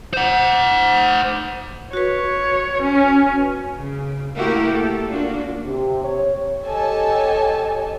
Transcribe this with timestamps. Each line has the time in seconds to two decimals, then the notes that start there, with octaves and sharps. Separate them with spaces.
0.13 C5 F#5
1.93 F#4 B4 C#5
2.82 C#4
3.76 C#3
4.37 A3 A#3 E4 F#4 G4 A#4
4.70 A4
5.08 A#3 D4 F4 F#4
5.65 C3
6.04 C#5
6.63 G4 A4 C#5 D#5 G#5 A5